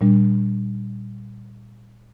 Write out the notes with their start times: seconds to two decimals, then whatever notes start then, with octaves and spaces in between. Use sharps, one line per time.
0.01 A#2 G3 D4